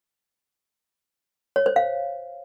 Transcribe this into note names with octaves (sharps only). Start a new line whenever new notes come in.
C#5
C5
F5